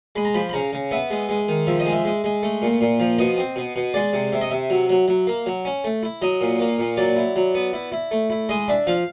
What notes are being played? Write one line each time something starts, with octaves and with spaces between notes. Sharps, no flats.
G#3 B5
A#5
F3 B5
B5
C#3 A#5
C#3
B3 E5
G#3
G#3
D#3
F3 E5
D#5
G#3
E5
G#3
G#3
A3
A#2
A#2
F3
B2 D#5
C4
B2
B2
G#3 D5
C3
C3 E5
D#5
C3 E5
F#3
F#3
F#3
A#3
F#3
C#4
A3
E4
F#3 D#5
A#2
A#3
A#2
F#3 D5
E4
F#3
B3
E4
E4
A3
E4
G#3 D#5
D4 E5
F3 F5